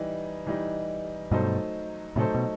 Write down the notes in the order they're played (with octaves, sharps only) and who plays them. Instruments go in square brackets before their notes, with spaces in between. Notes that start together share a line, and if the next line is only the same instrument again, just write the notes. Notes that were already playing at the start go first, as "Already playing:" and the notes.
Already playing: [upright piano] E3 G3 D#4
E3 G3 D#4
[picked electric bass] G2 B2 [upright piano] F#3 A3 D#4 A4 C5
[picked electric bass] A2 C3 [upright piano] F#3 A3 D#4 A4 C5
[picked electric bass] B2